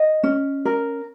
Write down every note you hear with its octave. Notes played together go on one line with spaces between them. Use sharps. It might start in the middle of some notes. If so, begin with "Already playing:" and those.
Already playing: D#5
C#4
A#4